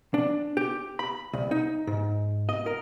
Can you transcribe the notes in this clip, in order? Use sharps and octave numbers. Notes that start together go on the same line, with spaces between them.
D4
G4
B5
C2
D#4
G#2
D#5
A#4